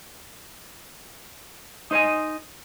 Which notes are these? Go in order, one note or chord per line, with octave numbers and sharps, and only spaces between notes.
D#4 C5 D#5 G#5